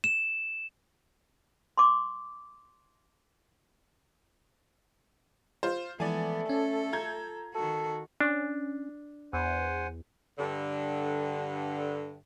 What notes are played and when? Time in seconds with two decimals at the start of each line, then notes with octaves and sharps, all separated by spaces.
0.04 E7
1.77 C6 D6
5.63 F4 C5
6.00 E3 F3 G#3 A3 B3 D5 G#5
6.49 C#4 A4
6.93 F4 A#5 G6 G#6
7.55 D#3 F#4 A4
8.20 C#4 D4
9.33 E2 C5 F#5 G#5
10.39 G2 D3